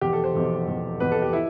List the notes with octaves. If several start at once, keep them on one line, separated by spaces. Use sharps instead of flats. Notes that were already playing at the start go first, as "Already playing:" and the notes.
F1 E2 B2 G4
A4
C5
F1 E2 B2
F1 E2 B2
F1 E2 B2 B4
A4
G4
E4